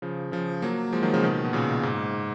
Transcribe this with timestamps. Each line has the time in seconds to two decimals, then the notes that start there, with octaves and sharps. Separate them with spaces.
0.02 C#3 F3
0.32 C#3 F3
0.62 F#3 A#3
0.92 F3 G#3
1.02 D#3 F#3
1.14 C#3 F3
1.23 B2 D#3
1.44 B2
1.53 A#2 C#3
1.83 G#2